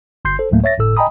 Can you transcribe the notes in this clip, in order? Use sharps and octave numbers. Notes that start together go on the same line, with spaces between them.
G1 C6 G6 C7
A4 C5
D2 A2 F#3 A3 A#3
C#5 E5 A6 A#6
G1 A2 A4 E6
D#5 G5 G#5 A#5 B5 D#6